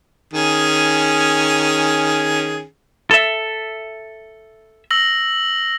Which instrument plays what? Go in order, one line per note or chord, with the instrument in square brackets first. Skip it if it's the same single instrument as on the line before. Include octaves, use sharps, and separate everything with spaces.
[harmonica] D#3 C#4 G#4
[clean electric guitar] A4 E5
[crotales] E6 A#6 F#7